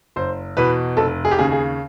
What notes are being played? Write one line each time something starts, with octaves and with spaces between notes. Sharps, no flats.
F#1 C5
E2 B2 B4
F1 A4
G#4
G4
D#2 C#3 G#4
G#4